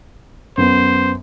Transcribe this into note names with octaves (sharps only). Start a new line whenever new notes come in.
F#2 B3 C5